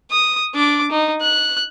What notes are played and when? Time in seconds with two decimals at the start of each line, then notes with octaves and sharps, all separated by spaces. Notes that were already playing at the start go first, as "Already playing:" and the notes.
0.11 D#6
0.55 D4 D6
0.91 D#4
1.21 F#6